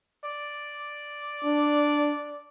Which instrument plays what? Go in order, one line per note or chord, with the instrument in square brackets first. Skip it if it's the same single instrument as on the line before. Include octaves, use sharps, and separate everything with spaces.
[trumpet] D5
[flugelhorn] D4